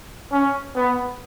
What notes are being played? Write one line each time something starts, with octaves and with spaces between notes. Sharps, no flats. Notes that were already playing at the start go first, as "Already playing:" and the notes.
C#4
B3